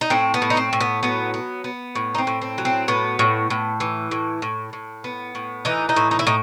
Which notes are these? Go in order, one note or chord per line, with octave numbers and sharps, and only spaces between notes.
D#4
A2 C4
B3
A2
D#4
C4
A2
B3
F#3 B3
B3
B3
A2
D#4
C4
A2
C4
F#3
C4
A2 B3
A2
A2
E3
A2
A2
A2
B3
A2
E3 D#4
D#4
A2
D#4
E4
A2 D#4